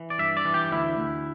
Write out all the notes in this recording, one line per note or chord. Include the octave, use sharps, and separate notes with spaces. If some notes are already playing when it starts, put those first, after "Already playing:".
Already playing: E3
D5
G2 E5
D5
E3
G4
D2 E4
D2